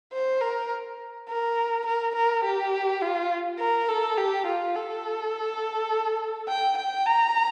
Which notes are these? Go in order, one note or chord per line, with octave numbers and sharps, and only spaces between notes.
C5
A#4
A#4
A#4
A#4
G4
F4
A#4
A4
G4
F4
A4
G5
G5
A#5